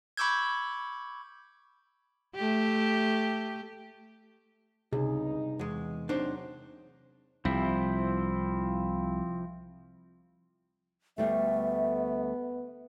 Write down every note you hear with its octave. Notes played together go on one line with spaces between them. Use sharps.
B5 C#6 D6 E6 G6 G#6
A3 G4
C#2 G2 C3 D#4 G#4
E2 G#3
F#3 C4 D4 D#4 C5
C2 F3 C4 E4
D2 G3 A3 B3 E5